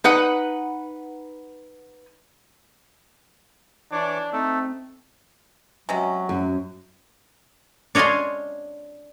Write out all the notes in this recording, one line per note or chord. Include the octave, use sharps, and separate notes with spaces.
D#4 B4 F#5
E3 D4 C#5 D6
A3 C4 D#4 A4
C3 F#3 G#3 C#4
F#2
D4 C#5 D#5 F5 G#5 C6